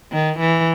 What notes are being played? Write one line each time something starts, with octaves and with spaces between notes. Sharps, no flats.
D#3
E3